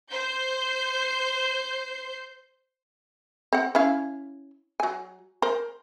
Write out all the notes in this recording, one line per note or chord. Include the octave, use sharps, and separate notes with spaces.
C5 G6 C7
C4 F#5
C#4 E4 F5
F#3 G#5
A#4 C5